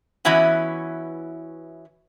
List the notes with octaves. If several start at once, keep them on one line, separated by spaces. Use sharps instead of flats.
E3 B3 C#4 E4 F#4